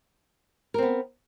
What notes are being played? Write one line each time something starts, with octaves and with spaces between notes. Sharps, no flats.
B3 C4 A#4